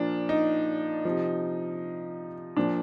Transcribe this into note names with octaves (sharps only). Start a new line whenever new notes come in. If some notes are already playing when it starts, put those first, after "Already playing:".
Already playing: A#2 F3 D4
D#4
C3 F3
A#2 F3 D4